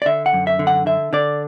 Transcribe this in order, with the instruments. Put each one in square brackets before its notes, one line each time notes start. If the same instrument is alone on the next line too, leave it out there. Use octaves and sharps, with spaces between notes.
[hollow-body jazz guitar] D5
D3 E5
F#5
F#2
E5
D3
F#5
D3 E5
D3 D5